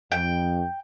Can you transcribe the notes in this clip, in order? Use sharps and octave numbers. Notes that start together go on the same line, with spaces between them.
F2 G5